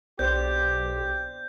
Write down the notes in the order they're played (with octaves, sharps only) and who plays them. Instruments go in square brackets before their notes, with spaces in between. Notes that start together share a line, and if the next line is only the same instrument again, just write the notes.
[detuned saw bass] B1 [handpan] B3 C5 D5 [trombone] G4 [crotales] G6